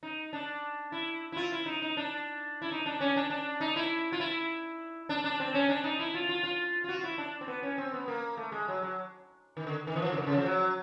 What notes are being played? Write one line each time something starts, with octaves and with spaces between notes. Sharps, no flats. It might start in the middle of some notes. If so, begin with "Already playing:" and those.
D#4
D4
E4
E4
F4
E4
D#4
D#4
D4
E4
D#4
D4
C#4
D4
D4
D#4
E4
F4
E4
D4
D4
C4
C#4
D4
D#4
E4
F4
F4
F4
F4
F#4
F4
E4
D4
C4
B3
C#4
C4
B3
A#3
A3
G#3
F#3
F#3
D#3
D3
D#3
E3
F3
D3
D#3
D3
C#3
F3
F#3